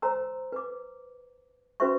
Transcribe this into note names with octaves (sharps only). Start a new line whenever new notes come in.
C5 C#5 A#5 C6 E6
B4 D6
C#4 F#4 B4 C5 E5 C#6